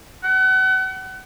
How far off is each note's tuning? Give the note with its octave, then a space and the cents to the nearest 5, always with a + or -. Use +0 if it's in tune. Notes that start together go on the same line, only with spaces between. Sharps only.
F#5 +35